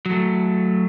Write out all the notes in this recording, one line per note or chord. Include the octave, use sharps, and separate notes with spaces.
F#3 A3